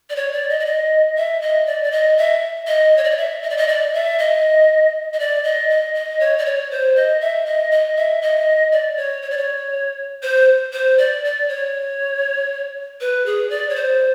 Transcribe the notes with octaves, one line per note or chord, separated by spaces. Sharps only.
D5
C#5
D5
D#5
D5
D#5
E5
D#5
D5
D5
D#5
E5
D#5
C#5
D5
D#5
E5
D#5
D5
D#5
D5
E5
D#5
D#5
D5
D#5
D#5
D#5
C#5
D5
C#5
C5
D#5
E5
D#5
D#5
E5
D#5
D5
C#5
C#5
D5
C#5
C5
C5
D5
D5
C#5
B4
G#4
D5
C#5
C5